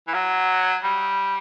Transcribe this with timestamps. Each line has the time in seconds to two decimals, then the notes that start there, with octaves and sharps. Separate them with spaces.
0.08 E3
0.14 F#3
0.83 G3